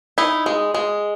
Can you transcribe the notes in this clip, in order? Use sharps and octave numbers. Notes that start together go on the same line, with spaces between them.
D#4 E4
G#3
G#3